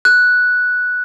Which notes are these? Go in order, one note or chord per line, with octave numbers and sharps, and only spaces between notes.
F#6